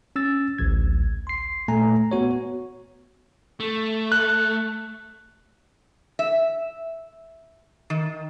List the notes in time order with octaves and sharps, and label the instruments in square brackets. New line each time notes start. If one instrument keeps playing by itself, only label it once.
[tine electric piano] C#4 E6 A6
A1 D2 G#6
C6 C7
A#2 A3 G#5 A#5
B3 F#4 C#5
[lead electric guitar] A3
[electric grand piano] F#6
[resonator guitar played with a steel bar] E5
D#3